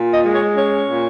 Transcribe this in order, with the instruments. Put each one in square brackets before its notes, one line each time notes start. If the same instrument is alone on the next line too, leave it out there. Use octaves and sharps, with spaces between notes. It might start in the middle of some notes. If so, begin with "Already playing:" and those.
Already playing: [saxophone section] A#2
D#5
G#3
C#5
C#4 C#5
A#2